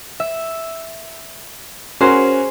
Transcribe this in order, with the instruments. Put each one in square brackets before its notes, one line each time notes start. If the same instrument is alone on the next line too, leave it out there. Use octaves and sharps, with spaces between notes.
[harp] E5
[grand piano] C#4 F#4 A#4 [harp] G#4 C5